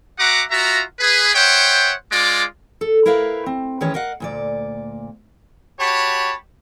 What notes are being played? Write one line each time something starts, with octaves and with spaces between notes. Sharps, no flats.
F#4 E5 F#5 A#5 D6
F4 F#4 E5 A#5
G#4 B4
C5 C#5 E5 F#5 G5
G#3 F4 D5 D6
A4
E4 A#4 B4 E5 F5
C4
D#3 E3 G#3 C#4 B4 C#5
A#4 D#5 F5 F#5
D2 A#2 D5
F#4 G4 C#5 A5 B5